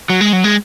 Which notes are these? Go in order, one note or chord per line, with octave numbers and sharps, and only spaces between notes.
F#3
G#3
F#3
G#3